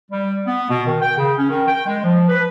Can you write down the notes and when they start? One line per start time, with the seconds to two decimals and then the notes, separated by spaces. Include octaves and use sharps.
0.11 G3
0.46 B3
0.69 B2
0.87 D#3
1.02 G5
1.18 C#3
1.38 C#4
1.50 D#3
1.68 G5
1.86 G#3
2.04 F3
2.29 B4